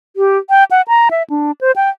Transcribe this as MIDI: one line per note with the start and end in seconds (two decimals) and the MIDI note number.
0.16 0.38 67
0.50 0.64 79
0.71 0.82 78
0.88 1.09 82
1.11 1.23 76
1.30 1.51 62
1.61 1.71 72
1.76 1.90 79